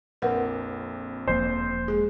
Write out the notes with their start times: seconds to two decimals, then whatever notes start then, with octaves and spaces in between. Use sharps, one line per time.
0.22 A#1 F2 A#4 B4 F#5
1.28 E1 F3 A#3 C5
1.88 G#3 G#4